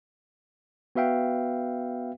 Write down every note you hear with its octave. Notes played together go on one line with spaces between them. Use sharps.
B3 F#4 B4 E5 F5 G5